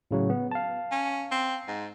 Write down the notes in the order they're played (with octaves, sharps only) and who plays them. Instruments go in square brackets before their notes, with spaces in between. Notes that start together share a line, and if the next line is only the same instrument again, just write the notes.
[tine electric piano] A2 C#3 F#3
B3
F5 A5
[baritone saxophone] C#4
C4
G#2